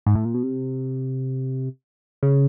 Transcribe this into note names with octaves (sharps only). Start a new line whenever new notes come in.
G#2
A2
A#2
B2
C3
C#3